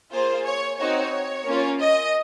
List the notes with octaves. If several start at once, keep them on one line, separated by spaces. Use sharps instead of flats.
A#3 F4 G#4 C5
C#5
C4 D#4 F#4 C#5
A#3 C#4 F4
D#5